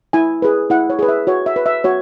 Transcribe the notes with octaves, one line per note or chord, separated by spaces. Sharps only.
E4 G#5
G#4 B4
E4 F#5
C#5
G#4 B4
E5
F#4 C#5
E5
B4
E5
F#4 C#5